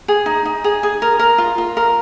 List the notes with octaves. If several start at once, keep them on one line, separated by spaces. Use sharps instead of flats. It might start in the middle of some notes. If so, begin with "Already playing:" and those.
G#4
D#4
D#4
G#4
G#4
A#4
A#4
F4
F4
A#4